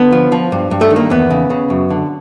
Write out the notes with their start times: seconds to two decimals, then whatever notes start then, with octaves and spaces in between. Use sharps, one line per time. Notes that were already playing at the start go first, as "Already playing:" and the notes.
Already playing: D3 B3
0.12 F3
0.32 F3
0.52 G2
0.71 G2
0.81 A3
0.90 D#3
0.96 A#3
1.10 E2 B3
1.31 C#3
1.50 C#3
1.70 F#2
1.90 D3